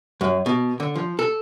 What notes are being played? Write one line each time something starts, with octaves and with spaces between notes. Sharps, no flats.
F#2
B2
D3
F3
A4